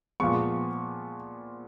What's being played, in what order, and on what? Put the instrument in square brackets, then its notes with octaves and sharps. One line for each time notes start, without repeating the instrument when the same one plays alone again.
[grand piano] A#2 F3 G#3 B3 C#6